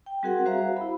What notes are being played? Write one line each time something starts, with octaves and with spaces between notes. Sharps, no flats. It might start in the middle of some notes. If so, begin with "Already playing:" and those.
G5
G3 C4 F#4 G#4 A#4 F#5
F#4 C5 E5 F5 A#5
E4 B5